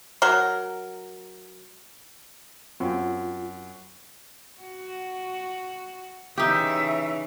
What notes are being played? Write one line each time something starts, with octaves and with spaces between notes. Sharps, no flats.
F#3 A#4
F#2 C4 F4
F#4
C#3 E3 D#4 G4 E5